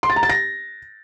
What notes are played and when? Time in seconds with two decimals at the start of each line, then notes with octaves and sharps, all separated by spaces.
0.03 C6
0.10 A6
0.16 A#5
0.23 A6
0.29 A#6